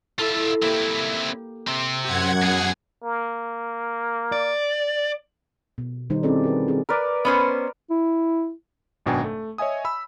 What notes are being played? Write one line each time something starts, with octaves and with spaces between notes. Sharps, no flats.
E4 F4 A4 E5
A#3 C4 E4 G4
C3 C4
F#2 G4 F#5 G#6 D#7
B2 G#4
A#3
D5
B2
D#3 G3 D#4 C5
C4 C#4 E4 G#4 A4 D5
F#4 A#4 B4
C4 G#4
A#4 B4 D5
B3 C#4 C5
E4
G#1 F#2 B2 D4 G5 G#5
A3
C#5 D#5 E5 G#5 D#6
B5 E6